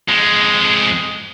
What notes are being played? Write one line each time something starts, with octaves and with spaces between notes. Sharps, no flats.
F2 G#3